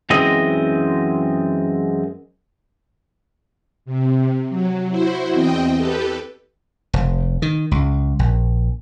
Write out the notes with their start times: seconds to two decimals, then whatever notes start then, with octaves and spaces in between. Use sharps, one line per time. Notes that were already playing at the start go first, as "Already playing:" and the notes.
0.10 F#2 E3 G#3 C4 D#5
3.85 C3
4.50 F#3
4.90 E4 F#4 C5
5.33 E2 C4 D#5 G5
5.76 G4 A4 B4
6.93 F1
7.42 D#3
7.71 C#2
8.19 A#1